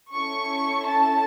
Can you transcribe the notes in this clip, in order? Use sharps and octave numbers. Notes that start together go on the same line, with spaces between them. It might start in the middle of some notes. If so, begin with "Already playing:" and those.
C#4 E4 A4 C#6
A5